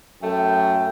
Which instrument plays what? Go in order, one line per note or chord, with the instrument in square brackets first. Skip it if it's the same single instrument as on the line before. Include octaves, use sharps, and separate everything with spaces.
[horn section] F#2 A3 G5